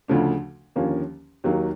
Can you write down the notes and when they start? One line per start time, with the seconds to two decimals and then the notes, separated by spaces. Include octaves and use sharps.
0.08 D2 C#3 F3 A3 D4
0.75 D#2 D3 F3 A#3 C#4
1.44 D#2 D#3 F#3 A#3